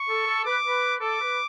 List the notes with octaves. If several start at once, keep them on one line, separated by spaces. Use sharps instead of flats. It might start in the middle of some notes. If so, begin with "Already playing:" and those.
Already playing: C#6
A4
A4
B4 D6
B4
A4 D6
B4